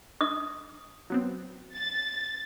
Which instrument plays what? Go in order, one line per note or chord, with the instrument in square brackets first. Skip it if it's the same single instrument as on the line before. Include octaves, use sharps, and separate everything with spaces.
[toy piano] D#6
[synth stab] F#3 B3 C4
[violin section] A6